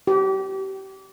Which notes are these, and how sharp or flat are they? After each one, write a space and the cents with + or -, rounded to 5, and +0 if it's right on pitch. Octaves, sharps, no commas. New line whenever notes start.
G4 -30